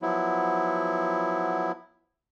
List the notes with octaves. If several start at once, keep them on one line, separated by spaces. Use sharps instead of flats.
F3 F#3 B3 E4